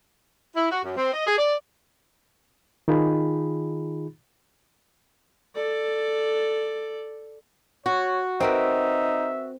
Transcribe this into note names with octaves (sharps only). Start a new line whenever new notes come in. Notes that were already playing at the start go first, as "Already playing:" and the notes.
E4
F#4
F#2
C4
D#5
G#4
D5
D#3 D#4 F4 G#4 B5
A4 D5
F#4 C#5
C4 D#4 A#4 B4 E5